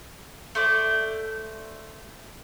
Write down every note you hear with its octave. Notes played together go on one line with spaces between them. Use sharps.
A3 C5 D5